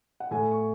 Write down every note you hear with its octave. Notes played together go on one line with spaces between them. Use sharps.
F#5
A2 G#5
C#6